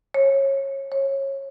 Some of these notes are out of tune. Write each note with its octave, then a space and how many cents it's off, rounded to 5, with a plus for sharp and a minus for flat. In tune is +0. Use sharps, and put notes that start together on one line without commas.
C#5 -25
C#5 -25